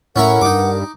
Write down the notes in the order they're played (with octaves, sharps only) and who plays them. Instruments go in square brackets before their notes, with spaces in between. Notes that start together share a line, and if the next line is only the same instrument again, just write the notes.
[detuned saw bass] A2 [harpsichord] C#4 E4 A#5 [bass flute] A#4 [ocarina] F#5
[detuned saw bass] G2 [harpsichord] D#4 D6